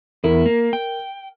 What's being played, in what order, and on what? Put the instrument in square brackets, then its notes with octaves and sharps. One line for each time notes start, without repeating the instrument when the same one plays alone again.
[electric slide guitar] E2 E4 [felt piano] A#4
[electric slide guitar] A#3
G5